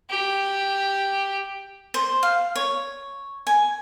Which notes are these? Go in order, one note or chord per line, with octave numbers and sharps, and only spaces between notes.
G4
C5
F5
C#5
G#5